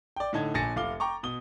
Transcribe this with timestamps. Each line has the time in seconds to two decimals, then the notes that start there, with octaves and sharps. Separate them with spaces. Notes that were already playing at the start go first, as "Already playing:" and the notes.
0.16 D5 G5
0.33 A2 D3 D#4 A5 G#6
0.54 A#1 D4 G#5 A6 A#6 C#7
0.76 F1 F5 D6 G7
1.00 G5 A#5 C#6 D6
1.23 B2 D#6 G7